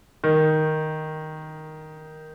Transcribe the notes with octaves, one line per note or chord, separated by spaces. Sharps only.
D#3